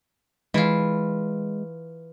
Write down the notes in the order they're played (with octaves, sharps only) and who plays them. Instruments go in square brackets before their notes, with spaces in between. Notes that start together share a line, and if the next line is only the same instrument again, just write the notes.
[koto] E3 F4 [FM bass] G#3